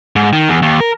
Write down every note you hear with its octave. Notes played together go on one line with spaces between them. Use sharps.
G#2
D#3
E2
D#2
A#4